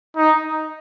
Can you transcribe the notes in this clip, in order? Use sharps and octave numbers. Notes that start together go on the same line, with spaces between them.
D#4